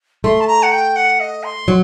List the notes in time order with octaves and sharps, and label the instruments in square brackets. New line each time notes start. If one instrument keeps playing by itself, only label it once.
[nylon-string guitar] A3 [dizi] C6
[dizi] A5
A#5
F#5
G5
F#5
D#5
C6
[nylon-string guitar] F#3